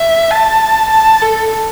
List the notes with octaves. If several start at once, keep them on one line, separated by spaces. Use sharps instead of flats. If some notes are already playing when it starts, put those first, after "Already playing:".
Already playing: E5
A5
A5
A4